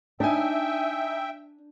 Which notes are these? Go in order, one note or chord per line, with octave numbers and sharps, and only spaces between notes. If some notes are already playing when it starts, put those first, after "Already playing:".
D4 D#4 E5 G5 G#5